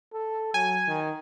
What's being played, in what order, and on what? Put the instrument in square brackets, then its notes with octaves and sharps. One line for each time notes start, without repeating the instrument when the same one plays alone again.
[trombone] A4
[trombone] F#3 [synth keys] G#5
[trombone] D#3